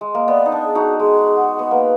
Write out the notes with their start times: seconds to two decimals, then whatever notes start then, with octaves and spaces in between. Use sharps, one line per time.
0.01 G#3
0.14 A#3
0.28 B3 D5
0.46 D#4
0.52 D4
0.64 G#4
0.75 D#4 F#4
0.99 G#3 G#4
1.36 F#5
1.59 B3
1.71 A#3 B4